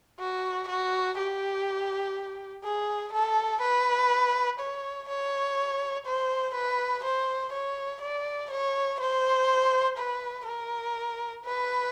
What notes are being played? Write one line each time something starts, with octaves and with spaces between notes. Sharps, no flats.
F#4
F#4
G4
G#4
A4
B4
C#5
C#5
C5
B4
C5
C#5
D5
C#5
C5
B4
A#4
B4